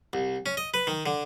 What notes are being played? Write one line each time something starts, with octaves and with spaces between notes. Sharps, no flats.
C2
C#4
D#5
B4
D#3
D3